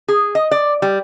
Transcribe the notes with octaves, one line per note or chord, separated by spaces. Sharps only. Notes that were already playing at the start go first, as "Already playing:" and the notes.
G#4
D#5
D5
G3